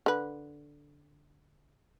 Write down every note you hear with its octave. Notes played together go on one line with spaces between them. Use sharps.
D3 B4